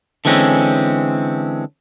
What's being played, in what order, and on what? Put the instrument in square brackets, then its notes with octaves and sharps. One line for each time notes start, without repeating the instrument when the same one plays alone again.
[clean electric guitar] D3 E3 G#3 C4 C#4